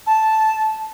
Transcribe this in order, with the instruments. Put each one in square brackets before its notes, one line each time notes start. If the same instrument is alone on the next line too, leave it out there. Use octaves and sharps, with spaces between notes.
[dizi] A5